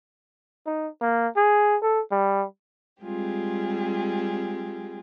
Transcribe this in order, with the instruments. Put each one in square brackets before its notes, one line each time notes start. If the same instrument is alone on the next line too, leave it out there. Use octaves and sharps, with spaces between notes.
[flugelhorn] D#4
A#3
G#4
A4
G3
[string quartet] G3 G#3 C4 F4 G4 G#4